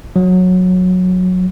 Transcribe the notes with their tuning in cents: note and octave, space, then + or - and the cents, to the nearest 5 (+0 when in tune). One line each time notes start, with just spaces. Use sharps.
F#3 -15